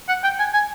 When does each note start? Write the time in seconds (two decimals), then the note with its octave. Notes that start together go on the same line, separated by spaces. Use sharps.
0.08 F#5
0.24 G5
0.39 G#5
0.54 G#5